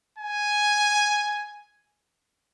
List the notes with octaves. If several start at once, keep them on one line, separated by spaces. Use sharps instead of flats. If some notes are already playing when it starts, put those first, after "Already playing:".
G#5